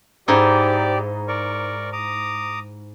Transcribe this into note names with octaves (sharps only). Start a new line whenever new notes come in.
G#2 D#4 E4 G4 D5
A#4 D5 C#6
A#5 D6 D#6